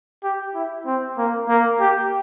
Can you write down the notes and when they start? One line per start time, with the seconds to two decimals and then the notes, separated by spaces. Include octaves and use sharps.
0.23 G4
0.55 E4
0.86 C4
1.17 A#3
1.49 A#3
1.80 G4